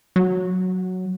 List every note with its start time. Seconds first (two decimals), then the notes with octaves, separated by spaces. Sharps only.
0.16 F#3